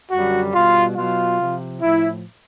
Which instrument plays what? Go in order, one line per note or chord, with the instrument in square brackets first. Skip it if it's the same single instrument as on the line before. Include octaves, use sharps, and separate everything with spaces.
[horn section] F#2 D3 G3 F#4
B2 G3 F4
B2 F#3 F4
C3 F3
A2 F3 E4